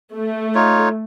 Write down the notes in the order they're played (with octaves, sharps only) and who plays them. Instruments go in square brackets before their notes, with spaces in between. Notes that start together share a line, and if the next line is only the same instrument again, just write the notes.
[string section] A3
[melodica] D#4 F4 C#5